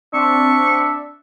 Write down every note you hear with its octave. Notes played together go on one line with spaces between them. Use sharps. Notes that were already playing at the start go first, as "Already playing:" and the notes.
C4 D4 E5 C#6